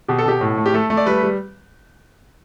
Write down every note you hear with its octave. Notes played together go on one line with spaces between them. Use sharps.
B2 G4
A4
B2 G4
A2
A3
G4
A3 A4
A3
D5
G3 B4
G3